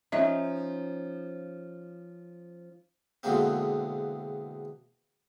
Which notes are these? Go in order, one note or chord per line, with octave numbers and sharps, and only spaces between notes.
F3 C#4 D#4 D#5 E5
E2 B2 D3 G#3 A#3 C4